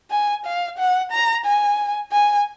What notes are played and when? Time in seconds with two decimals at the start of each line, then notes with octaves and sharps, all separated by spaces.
0.11 G#5
0.45 F5
0.78 F#5
1.12 A#5
1.45 G#5
2.12 G#5